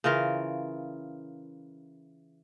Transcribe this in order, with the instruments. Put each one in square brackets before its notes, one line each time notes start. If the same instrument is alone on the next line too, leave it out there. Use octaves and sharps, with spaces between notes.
[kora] C#3 E3 F4 A#4